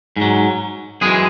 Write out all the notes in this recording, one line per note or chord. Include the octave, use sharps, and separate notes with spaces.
G#2 F#3
F#2 E3 G#3 G#4